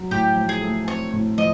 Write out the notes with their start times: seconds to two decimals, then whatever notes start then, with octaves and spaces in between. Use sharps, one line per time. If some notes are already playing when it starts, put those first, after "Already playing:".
Already playing: F#3
0.11 A2 G4
0.36 F3
0.49 G#4
0.61 A3
0.87 C4 C#5
1.13 A2
1.38 F3 D#5